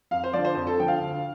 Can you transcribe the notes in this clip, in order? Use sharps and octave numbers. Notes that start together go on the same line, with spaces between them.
F2 F5
C5
D3 F3 D5
C5
F2 C5
A4
D3 F3 G5
F5
D2